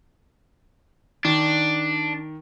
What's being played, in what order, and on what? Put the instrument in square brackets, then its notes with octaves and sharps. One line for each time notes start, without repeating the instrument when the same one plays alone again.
[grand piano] D#3 [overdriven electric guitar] D4